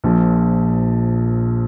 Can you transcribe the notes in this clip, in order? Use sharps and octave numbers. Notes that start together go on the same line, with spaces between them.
A#1 A#2 F3